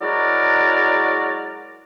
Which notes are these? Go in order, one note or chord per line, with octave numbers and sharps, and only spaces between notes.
F#3 G#3 E4 F#4 A#4 D5